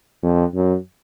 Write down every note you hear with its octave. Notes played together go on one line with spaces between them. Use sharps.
F2
F#2